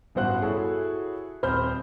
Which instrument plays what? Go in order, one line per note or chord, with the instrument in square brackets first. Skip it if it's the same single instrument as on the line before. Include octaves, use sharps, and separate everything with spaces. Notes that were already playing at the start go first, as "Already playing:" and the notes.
[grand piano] A1 G2 B2 C5 F#5 F#6
E4 F#4 G#4 A4 C#5
D#1 C4 C5 B5 F6 G6